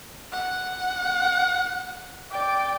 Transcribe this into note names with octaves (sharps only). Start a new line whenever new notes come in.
F#5
D5 G5